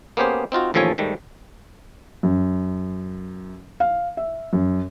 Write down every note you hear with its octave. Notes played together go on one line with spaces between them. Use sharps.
A#3 B3 C#4 G4 G#4 C5
C4 D#4 F4 F#4
A1 D#2 F3 A4 C#5 G#5
G#2 D#3 G3 A3
F#2
F5
E5
F#2